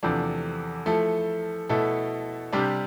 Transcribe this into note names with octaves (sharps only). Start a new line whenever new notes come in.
E2 C3 F3 A3 D4
F3 A3 E4 A4
B2 A3 E4 A4
C3 G3 D4 G4